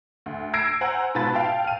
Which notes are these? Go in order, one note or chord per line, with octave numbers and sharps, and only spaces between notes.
D2
E6 G#6 A#6 C7 D7
C5 F#5 G#5 A#5
G#2 B2 F4 B4 A5 A6
F5 G5 A5
F6 D#7